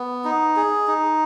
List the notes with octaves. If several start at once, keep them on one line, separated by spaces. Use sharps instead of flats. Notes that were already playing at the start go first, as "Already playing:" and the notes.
Already playing: B3
D#4
G#4
D#4